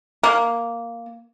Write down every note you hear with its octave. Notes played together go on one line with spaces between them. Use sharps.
A#3